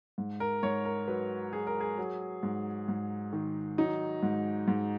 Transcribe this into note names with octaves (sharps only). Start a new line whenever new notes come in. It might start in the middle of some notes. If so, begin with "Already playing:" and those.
G#2
A#4
G#2 C#5
A#4
F#3 B4
F#3 G#4
A#4
G#4
F#3
G#2
G#2
D#3
F#3 D#4
G#2
G#2